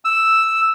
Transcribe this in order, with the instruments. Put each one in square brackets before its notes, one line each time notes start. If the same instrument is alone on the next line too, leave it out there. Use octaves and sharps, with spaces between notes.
[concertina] E6